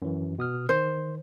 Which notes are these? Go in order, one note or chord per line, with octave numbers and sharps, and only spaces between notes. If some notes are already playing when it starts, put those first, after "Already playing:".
F#2 E3
B2 D#6 F6
D#3 C5